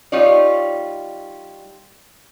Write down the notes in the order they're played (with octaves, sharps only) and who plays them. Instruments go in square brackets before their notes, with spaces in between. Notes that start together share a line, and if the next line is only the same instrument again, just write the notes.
[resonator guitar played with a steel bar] G3 D#4 F4 C#5 D5